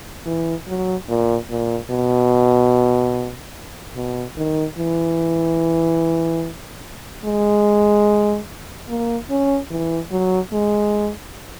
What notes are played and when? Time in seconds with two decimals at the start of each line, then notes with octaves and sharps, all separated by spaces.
0.26 E3
0.67 F#3
1.08 A#2
1.49 A#2
1.90 B2
3.96 B2
4.37 D#3
4.78 E3
7.25 G#3
8.88 A#3
9.30 C#4
9.70 E3
10.11 F#3
10.53 G#3